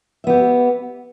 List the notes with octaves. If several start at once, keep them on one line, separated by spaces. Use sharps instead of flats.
B3 G4 E5